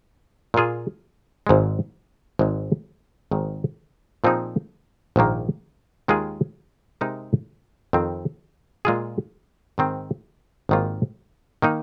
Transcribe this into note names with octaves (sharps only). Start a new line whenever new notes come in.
A#2 A#3 F4 G#4
G#1 G#2 G#3
G#1 G#2 G#3
G#1 G#2 D#3
A#2 F3 C4 D#4 G#4
A#1 G#2 D#3 A#3
D#2 D#3 G#3 F4 G#4
C3 G#3 D#4 A#4
F2 D#3 C4
A#2 G#3 F4 G#4
G#2 D#3 C4
G#1 G#2 D#3 A#3 F4
D#3 A#3 D#4